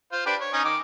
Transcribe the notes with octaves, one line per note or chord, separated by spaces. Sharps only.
F4 C5
D4 G4 B4
C#5
C#4 D#4
D#3 D6